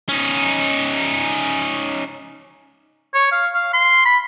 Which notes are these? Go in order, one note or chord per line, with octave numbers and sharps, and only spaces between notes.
C#4 D#4
C#5
F5
F5
C6
B5